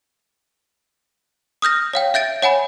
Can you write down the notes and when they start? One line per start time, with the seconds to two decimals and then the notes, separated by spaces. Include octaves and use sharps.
1.62 D#6 F6 G6 A#6
1.93 C#5 F5 G5
2.14 E5 G6 A6 D7
2.42 C#5 F#5 G#5 B5